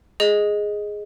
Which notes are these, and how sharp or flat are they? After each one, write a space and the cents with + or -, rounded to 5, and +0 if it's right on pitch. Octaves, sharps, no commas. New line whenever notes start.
G#4 +0 D#5 +0